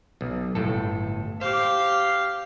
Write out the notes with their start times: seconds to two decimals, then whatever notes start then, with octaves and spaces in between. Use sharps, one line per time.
0.21 B1
0.55 G1 A2 A4
1.41 G4 C5 F5